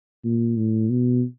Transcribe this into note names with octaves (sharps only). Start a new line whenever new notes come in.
A#2
A2
B2